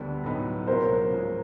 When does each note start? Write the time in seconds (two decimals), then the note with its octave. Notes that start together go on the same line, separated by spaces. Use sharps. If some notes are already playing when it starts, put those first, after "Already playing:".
Already playing: D2 D3 G3 B3 D4
0.24 A2 F#3 B3 D#4
0.67 C#2 C#3 F#3 A#3 A#4 C5
1.11 G#2 F3 G#3 C#4